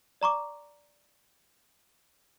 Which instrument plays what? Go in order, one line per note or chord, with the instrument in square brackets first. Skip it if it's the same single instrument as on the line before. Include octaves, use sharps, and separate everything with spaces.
[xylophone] D5 A#5 C#6 D6